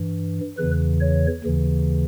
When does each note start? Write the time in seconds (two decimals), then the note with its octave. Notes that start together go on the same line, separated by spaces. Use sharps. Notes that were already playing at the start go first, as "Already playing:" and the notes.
Already playing: G2 E3
0.57 E2 C#3 E3 B4
1.01 C#5
1.44 D#2 C#3 E3